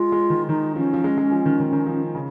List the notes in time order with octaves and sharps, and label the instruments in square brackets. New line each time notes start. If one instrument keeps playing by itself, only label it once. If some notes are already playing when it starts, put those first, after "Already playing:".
Already playing: [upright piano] G#3 [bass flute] F4
[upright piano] G#3
D#3
[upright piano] D#3 [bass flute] D#4
[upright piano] F3 [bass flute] C#4
[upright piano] F3
G#3
G#3
F3
D#3
D#3
D#3
F3
C#3